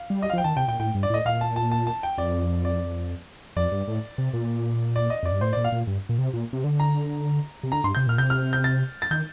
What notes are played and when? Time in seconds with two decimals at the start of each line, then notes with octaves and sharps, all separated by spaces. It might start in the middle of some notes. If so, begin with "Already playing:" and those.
Already playing: F5
0.10 G3
0.22 D#5
0.30 F5
0.33 F3
0.38 G5
0.44 D#3 A5
0.56 C3 G5
0.68 A#2 G5
0.80 A2 G5
0.95 G2
1.03 D5
1.10 A2 D#5
1.25 A#2 F5
1.41 A5
1.56 A5
1.71 A5
1.87 A5
2.03 G5
2.18 F2 D5
2.65 D5
3.56 F2 D5
3.72 G2
3.88 A2
4.18 C3
4.33 A#2
4.96 D5
5.10 D#5
5.23 F2 D5
5.32 G2
5.41 A2 C5
5.53 A#2 D5
5.64 F5
5.72 A#2
5.87 G2
6.09 A#2
6.18 C3
6.33 A#2
6.53 C3
6.64 D3
6.80 A#5
7.63 C3
7.72 D3 A#5
7.84 G2 C6
7.95 C3 G6
8.07 A#2 F6
8.18 C3 G6
8.30 F6
8.53 G6
8.64 A6
9.02 A6
9.11 D#3 G6